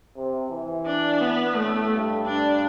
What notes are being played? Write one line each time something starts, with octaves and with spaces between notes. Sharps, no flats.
C3
E3
D4
B3
A2 A3
G2
D4